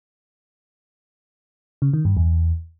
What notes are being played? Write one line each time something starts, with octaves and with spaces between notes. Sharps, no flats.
C#3
D#3
G2
E2